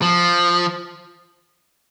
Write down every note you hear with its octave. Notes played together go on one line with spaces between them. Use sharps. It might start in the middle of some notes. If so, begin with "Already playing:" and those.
F3